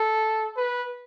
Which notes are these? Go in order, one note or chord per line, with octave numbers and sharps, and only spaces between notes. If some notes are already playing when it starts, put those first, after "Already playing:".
Already playing: A4
B4